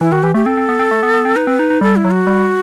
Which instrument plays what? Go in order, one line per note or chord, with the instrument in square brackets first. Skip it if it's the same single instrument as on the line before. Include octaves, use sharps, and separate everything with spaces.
[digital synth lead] E3 [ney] E4
[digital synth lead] D#3 [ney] F#4
[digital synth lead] E3 [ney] G4
[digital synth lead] A3 [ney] G4
[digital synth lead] C4 [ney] A4
[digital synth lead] C4
B3
C4
A3
B3
B3
C4
[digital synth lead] D#4 [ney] B4
[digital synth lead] C4
D#4
D#4
[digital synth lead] G3 [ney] A4
[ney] E4
[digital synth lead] F#3
[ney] F#4
[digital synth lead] G3